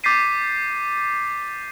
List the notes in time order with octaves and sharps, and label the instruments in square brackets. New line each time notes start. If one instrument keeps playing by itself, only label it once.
[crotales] D6 G6 A6 B6 C7 D#7